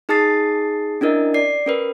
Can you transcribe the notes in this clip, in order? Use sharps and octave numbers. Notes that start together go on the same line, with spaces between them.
D#4 G#4 A5 D#6 A6 C7
C#4 D4 E4 A#4 D#5
D5 C7
C#4 A#4 B4